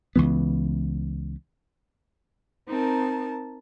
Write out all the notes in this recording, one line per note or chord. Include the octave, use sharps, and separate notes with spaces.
C#2 E3 B3
C4 D#4 A#4 A5